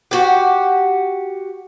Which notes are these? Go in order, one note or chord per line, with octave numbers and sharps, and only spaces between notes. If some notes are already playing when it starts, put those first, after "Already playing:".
F#4 G4